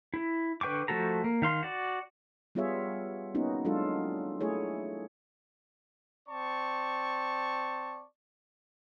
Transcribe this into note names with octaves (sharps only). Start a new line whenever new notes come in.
E4
D3 B4 G5 C#6 D6
F3 A3 F#4 A4 A#5
A#3
D#3 F5 C6
F#4 D5
G3 B3 F4 G#4 C#5 E5
A#3 B3 C#4 D#4 F#4
F#3 G#3 D4 F4 A4
A3 E4 G#4 C#5
C4 D5 A5 C#6